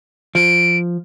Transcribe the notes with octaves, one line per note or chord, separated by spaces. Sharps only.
F3 D7